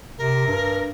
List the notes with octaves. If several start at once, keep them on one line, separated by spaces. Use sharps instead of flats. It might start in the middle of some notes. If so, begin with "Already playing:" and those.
C3 A#4
G2